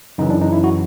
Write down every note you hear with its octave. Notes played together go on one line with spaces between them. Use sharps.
F#2 C#3 E3 D#4
D4
D#4
E4
F#4